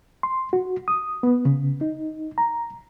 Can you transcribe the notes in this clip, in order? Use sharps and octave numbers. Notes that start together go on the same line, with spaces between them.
C6
F#4
D#6
B3
C#3
D#4
A#5